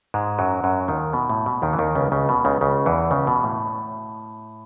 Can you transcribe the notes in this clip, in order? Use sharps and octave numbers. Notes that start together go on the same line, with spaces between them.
G#2 G#3
F#2 F#3
F#2 F#3
D#2 D#3
B2
A2
B2
D#2 D#3
E3
D#2 D#3
C#2 C#3
C#2 C#3
B2
C#2 C#3
C#2 C#3
E2 E3
C#2 C#3
B2
A2